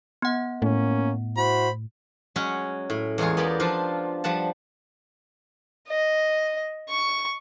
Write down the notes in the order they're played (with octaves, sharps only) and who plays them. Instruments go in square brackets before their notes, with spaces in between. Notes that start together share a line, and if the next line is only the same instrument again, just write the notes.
[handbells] B3 F#5
[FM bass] A2 [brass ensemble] A#3 C#4
[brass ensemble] E4 F#4 C5 [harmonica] B5
[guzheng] F#3 G#3 C#4 F#5
A2
E2 G#3 F4 F#4 G#4
B3 G4 A#4 D5 G5
F3 D4 F4
F3 G3 F#5 A5
[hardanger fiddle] D#5
C#6